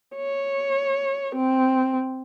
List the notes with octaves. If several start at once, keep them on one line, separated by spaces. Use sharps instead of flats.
C#5
C4